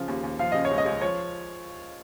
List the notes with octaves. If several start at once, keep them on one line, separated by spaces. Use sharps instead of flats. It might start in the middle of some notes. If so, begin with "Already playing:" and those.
Already playing: C#3 F3
D#2
D#2
F3 F5
C#3 D#5
C#5
C#2
D#5
C#2
F3 C#5